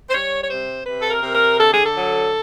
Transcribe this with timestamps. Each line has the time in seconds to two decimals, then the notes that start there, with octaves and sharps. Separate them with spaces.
0.09 C5
0.14 G3 C#5
0.43 C#5
0.50 C3 C5
0.86 C3 B4
1.01 A4
1.10 A#4
1.22 C3
1.34 A#4
1.58 D3 A4
1.72 G#4
1.86 A4
1.95 F#3